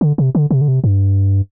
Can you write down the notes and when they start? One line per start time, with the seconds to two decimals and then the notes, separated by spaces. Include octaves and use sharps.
0.01 D3
0.18 C3
0.35 D3
0.51 C3
0.61 D3
0.68 C3
0.84 G2